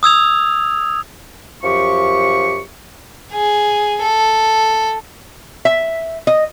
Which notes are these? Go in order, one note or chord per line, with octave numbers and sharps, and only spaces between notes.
D#6 E6 G#6 F7
F#2 F3 G4 C#6
G#4
A4
E5
D#5